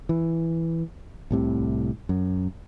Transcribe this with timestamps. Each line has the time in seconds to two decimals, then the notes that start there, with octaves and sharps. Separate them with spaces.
0.09 E3
1.31 C2 A2 C3
2.09 F#2